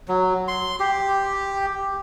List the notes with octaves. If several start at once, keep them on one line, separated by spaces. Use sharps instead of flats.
F#3
C6
G4